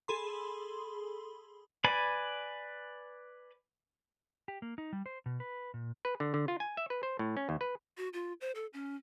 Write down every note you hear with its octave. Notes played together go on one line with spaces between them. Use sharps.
G#4 A4 B5 C6
B4 D5 G#5 B5
G4
A#3
D#4
G3
C5
B2
B4
A#2
B4
D3
D3
F4
G#5
E5
B4
C5
A2
C#4
D#2
B4
F#4
F4
C5
A4
C#4